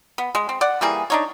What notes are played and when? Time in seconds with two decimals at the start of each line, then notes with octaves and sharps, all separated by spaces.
0.18 B3
0.35 G#3
0.49 C4
0.61 D5 F#5
0.81 E3 G3 A#3 G#4
1.10 D4 D#4 C#5